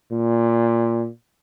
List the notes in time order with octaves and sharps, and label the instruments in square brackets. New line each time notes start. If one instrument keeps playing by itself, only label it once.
[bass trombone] A#2